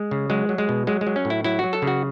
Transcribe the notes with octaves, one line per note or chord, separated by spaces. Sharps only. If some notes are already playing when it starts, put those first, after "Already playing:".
Already playing: G#3
C#3
F#3 G#3
F#3
G#3
B2
F#3 G#3
G#3
F#3
C#4
A2
E4
F#3 E4
F#3 F#4
A4
C#3
F#4